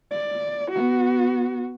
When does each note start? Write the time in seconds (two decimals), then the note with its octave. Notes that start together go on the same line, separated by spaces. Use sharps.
0.11 D5
0.71 B3 F#4